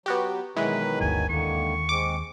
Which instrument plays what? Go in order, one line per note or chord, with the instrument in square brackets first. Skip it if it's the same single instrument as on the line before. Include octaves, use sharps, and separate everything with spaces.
[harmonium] F#3 [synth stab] B3 F#4 G4
[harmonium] B2 D#3 F#3 [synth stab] E3 G#3 [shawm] B4
[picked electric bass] G1 D2 [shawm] G#5
[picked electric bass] D#2 [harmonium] D3 D#3 A#3 [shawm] C#6
[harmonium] G#3 C4 [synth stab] D6